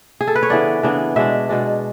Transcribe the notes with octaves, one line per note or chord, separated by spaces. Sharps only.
G#4
A4
B4
C#5
C#3 E3 B3 D4 D5
C#3 E3 B3 D4
B2 G#3 D4 E5
B2 G#3 D4